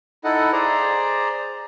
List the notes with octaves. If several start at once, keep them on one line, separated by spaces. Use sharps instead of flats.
D#4 E4 A4 D#5 F#5
G#4 C5 D5 A#5